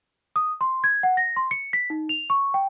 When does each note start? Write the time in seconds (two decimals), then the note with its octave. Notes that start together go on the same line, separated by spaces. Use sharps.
0.36 D#6
0.61 C6
0.84 G#6
1.03 F#5
1.17 A#6
1.37 C6
1.51 C#7
1.73 B6
1.90 D#4
2.09 F7
2.30 C#6
2.54 G5